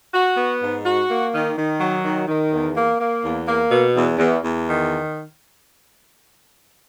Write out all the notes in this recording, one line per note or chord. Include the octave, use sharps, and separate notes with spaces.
F#4
B3
G#2
F#4
A#3
D#3
D#3
F#3
D#3
D#3
E2
A#3
A#3
E2
A#3
B2
E2
E2
E2
D#3